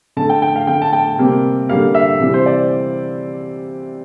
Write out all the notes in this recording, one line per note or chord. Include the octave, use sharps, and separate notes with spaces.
D3 A3 A5
G5
G5
F5
D3 A3 G5
A5
G5
C3 G3 A#3
D3 G3 A#3 F5
E5
C3 E3 G3
C5
D5